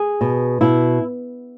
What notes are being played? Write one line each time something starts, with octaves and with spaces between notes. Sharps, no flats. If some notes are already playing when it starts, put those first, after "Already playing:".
Already playing: G#4
B2
B2 E4